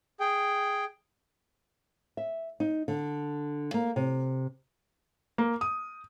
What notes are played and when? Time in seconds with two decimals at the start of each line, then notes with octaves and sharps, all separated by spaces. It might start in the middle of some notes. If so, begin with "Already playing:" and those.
0.20 G#4 G5
2.17 E5
2.60 D#4
2.88 D3
3.74 A#3
3.96 C3
5.38 A#3
5.61 D#6